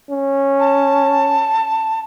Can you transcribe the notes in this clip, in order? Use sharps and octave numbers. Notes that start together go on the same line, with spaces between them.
C#4
A5